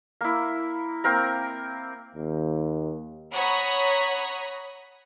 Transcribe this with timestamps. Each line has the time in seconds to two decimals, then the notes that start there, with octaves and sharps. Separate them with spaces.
0.21 A#3 E4
1.04 A#3 C4 A#4 A#5
2.15 D#2
3.32 C#5 F#5 A#5 B5 D#6